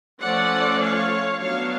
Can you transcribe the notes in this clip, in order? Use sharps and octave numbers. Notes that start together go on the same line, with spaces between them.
F3 A3 C#4 D5 F#5
C#5 F5
F#3 B3 D4 C#5 F5